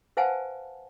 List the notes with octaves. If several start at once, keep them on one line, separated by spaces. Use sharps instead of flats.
B4 C5 F5 F#5 G#5 A5